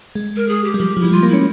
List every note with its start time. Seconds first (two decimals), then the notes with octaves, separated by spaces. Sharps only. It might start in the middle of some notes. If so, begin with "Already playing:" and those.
0.15 G#3
0.36 A#4
0.48 G#4
0.64 G4
0.74 G3
0.79 F3 G4
0.97 F3
1.01 G3 E4
1.12 G#3 F4
1.23 A#3
1.28 E4
1.33 C#4